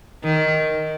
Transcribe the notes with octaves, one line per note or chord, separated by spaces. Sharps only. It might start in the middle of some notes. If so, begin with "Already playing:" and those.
D#3